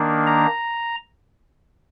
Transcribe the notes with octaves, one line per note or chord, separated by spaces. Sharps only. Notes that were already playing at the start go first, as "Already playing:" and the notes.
Already playing: D#3 A#3 D4
A#5